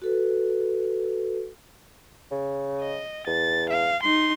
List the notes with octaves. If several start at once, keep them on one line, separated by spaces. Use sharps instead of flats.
F#4 A4 B4
C#3
D#5
E2 A6
F5
D#4 C6